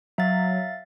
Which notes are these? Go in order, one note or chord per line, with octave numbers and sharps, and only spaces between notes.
F#3 E5 F5 A6